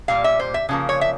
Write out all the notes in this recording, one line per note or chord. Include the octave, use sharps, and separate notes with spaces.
A#2 G3 A#3 F5
E5
C5
E5
C#3 F3 A#3
C#5
E5